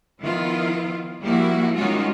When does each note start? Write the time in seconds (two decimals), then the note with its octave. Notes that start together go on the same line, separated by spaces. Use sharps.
0.22 D#3 F3 B3 E4 F4
1.22 F3 G3 A#3 E4 F#4
1.75 D#3 G3 G#3 C#4 F4 F#4